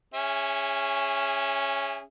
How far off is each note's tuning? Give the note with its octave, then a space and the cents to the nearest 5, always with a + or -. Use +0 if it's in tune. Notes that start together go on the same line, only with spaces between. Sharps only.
C#4 +0 G#4 -30 E5 +10